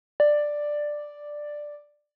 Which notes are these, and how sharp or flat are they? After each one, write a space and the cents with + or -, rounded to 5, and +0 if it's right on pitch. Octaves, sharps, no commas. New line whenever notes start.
D5 +5